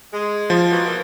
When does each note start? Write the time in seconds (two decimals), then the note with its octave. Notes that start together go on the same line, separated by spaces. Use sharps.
0.13 G#3
0.50 F3 F4
0.71 E3 F#3 B3
0.85 B2 E3 A#3